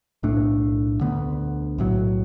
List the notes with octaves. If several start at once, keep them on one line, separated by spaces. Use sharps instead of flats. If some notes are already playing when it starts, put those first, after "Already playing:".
B1 A2 A3 D4
D2 D3 B3
B1 A2 F#3